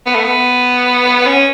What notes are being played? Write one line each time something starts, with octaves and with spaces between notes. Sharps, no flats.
B3
A3
B3
C#4